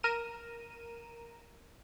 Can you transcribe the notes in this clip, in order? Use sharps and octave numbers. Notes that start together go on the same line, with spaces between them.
A#4 D#7 E7